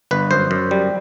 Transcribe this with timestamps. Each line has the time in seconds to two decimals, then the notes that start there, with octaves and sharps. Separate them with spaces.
0.11 G1 B4
0.31 F#2 C5
0.51 F#2
0.71 G3